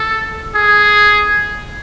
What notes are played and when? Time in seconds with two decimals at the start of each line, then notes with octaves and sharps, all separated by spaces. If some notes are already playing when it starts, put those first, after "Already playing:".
Already playing: A4
0.55 G#4